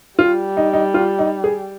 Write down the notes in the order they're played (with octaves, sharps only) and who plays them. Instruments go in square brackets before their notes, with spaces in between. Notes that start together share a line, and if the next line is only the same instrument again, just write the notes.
[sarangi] G3 [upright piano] F4
[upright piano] D#4
D#4
F4
D#4
G#4